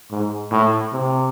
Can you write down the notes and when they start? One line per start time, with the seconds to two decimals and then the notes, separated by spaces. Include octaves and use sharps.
0.11 G#2
0.52 A2
0.93 C3